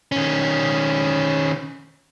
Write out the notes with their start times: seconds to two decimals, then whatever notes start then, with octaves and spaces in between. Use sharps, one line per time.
0.12 D#3 C#4